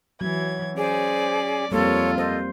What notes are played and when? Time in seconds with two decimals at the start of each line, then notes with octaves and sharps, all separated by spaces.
0.21 E3 F#3 G#6
0.77 C#4 G#4 C5 D5 D6
1.72 F2 G3 A#3 C4 F4 A4 C#5
2.18 A4 C5 D#5